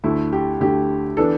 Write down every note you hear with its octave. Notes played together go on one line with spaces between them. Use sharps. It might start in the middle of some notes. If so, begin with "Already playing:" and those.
D2 D3 A3 E4
G4
D2 D3 A3 G4
E3 B3 D4 A4